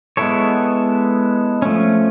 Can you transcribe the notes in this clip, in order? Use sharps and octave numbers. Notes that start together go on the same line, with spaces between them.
G#3 B3 E4 A4 C#5
F3 A3 C#4